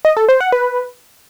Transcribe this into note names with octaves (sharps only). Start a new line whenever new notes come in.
D#5
A4
C5
F#5
B4